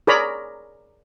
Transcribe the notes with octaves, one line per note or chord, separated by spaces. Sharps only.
G#4 A#4 C#5 D5 A#5 B5